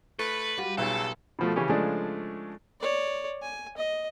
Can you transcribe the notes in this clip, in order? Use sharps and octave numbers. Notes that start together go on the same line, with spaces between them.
A3 B4
G3 F4 F#4
B1 C#3 A4
B2 F3 A3
C#3 E3 C#4 G4
C#3 F3 G#3 A3 D4
C#5 D5
G#5
D#5